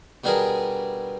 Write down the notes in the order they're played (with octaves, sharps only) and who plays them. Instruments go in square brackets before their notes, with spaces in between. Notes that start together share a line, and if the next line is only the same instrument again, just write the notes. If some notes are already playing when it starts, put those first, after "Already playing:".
[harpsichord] B2 G3 D4 G#4 A#4